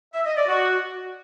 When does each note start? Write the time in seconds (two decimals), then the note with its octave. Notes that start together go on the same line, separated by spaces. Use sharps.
0.14 E5
0.25 D#5
0.36 D5
0.47 F#4